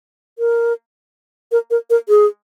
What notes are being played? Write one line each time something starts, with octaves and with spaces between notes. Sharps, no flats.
A#4
A#4
A#4
A#4
G#4